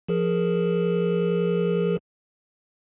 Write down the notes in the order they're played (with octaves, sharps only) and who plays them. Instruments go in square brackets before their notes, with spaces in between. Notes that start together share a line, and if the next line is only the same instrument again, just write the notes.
[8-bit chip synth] F3 G#4 A#4